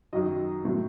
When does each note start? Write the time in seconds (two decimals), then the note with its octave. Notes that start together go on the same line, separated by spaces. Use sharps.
0.13 F#2 D#3 F#3 D#5
0.65 A2 F#3